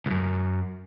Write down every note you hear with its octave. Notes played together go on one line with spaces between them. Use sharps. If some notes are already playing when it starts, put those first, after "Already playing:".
C#2 F#2